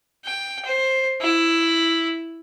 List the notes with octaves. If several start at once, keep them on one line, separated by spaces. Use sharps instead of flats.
G5
C5
E4